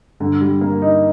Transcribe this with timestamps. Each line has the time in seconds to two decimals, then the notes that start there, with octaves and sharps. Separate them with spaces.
0.20 G2 D3
0.41 G3
0.61 A#3
0.82 D#4